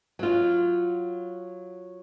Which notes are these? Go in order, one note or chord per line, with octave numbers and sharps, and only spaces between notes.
F#3 F4